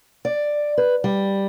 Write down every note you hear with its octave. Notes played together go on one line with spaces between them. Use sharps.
D5
B4
G3